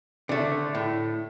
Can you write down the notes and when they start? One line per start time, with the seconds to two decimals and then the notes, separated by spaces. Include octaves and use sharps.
0.29 D3 A3
0.75 A2